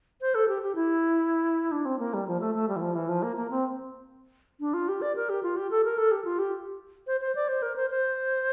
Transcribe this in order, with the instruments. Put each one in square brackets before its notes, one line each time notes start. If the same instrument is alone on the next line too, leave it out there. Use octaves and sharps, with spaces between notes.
[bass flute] C5
A4
G4
G4
E4
D4
C4
A#3
G3
F3
A3
A3
G3
E3
F3
E3
F3
A#3
A#3
C4
D4
F4
G4
D5
A#4
G4
F4
G4
A4
A#4
A4
G4
F4
G4
C5
C5
D5
C5
A#4
C5
C5